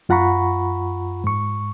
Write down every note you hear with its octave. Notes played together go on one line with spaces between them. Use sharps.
F#2 F4 F#5 A#5 B5 C#6
G#2 C#6